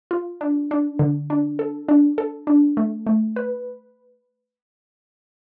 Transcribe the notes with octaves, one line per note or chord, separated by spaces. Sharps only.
F4
D4
D4
D3
D4
A4
D4
A4
D4
A3
A3
B4